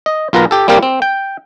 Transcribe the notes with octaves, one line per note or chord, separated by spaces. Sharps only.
D#5
B1 F4 A#4 B4 A#5
G4 A4
G3 A#3 C4 G4 A#4
C4
G5